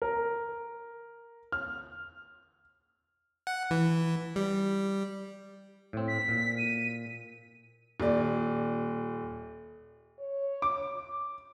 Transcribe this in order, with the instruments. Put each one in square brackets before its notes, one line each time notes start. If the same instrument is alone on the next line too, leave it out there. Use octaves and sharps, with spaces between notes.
[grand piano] A#4
F6
[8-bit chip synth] F#5
E3
G3
[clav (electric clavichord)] A2 C4
[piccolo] B6
[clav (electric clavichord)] A#2
[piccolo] D#7
[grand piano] D#1 D5
[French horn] C#5
[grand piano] D6